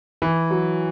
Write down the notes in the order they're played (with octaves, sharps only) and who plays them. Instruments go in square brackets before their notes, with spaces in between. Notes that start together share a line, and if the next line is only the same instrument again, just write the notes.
[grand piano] E3
F#3